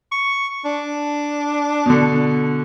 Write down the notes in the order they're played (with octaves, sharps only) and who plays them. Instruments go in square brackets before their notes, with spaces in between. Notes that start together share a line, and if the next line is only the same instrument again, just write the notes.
[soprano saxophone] C#6
D4
[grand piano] B2 D3